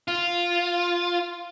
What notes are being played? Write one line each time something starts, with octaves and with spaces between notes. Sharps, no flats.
F4